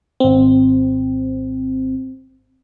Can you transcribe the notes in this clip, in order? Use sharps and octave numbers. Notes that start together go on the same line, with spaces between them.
G#1 C4